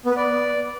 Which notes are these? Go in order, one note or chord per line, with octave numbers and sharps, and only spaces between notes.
B3
B4
D5